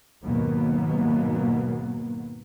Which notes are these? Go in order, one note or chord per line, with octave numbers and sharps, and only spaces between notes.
D#2 G#2 B2 F#3 A#3 B3